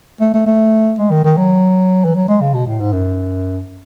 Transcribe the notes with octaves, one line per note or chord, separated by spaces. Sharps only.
A3
A3
A3
G#3
D#3
D#3
F#3
E3
F#3
G#3
C#3
B2
A2
G#2
F#2